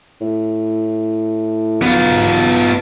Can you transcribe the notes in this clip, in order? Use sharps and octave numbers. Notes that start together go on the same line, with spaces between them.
A2
B1 B3 F4